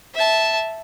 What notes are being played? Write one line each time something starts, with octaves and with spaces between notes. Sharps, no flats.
E5 A5